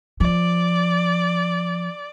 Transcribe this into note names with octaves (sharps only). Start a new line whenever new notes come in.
F3 D5